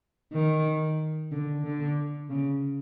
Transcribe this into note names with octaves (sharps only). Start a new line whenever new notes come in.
D#3
D3
D3
C#3